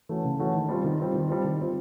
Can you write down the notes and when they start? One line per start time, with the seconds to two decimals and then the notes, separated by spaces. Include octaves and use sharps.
0.09 E3 A3 C#4 F#4
0.24 C#3
0.39 E3 A3 C#4 F#4
0.54 D#3
0.69 G3 C4 F4
0.84 D#3
0.99 G3 C4 F4
1.14 D#3
1.29 G3 C4 F4
1.44 D#3
1.59 G3 C4 F4